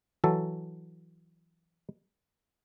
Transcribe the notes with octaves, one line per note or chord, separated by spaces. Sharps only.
E3 F#3 A4